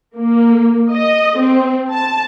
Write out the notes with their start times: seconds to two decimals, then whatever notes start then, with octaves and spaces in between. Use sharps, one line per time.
0.16 A#3
0.93 D#5
1.41 C4
1.93 A5